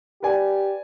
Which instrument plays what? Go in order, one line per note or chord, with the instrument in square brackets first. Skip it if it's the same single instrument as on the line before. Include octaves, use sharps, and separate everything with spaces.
[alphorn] G4 [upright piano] B4 D5 G#5